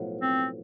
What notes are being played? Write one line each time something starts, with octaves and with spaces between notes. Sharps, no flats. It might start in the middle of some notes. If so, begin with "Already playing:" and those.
Already playing: B1 A2 F3 B3
C4